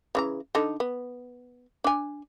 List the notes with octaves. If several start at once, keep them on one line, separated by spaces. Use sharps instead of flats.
C#3 E3 A#5
D3 D#4 A4
B3
D4 G#5